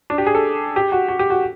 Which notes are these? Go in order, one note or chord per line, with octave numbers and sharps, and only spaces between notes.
D4
G4
G#4
A4
G4
F#4
F#4
G4
F#4